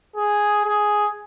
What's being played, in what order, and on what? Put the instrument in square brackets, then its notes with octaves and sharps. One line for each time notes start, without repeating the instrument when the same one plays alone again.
[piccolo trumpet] G#4
G#4